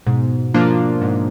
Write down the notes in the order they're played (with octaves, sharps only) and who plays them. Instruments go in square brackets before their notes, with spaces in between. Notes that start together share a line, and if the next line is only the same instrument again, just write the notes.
[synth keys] G#2 [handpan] B2
[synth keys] F3 A#3 D4 F4
G#2